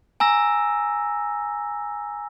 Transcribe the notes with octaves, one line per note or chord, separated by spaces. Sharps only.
G#5 A#5 E6 A#6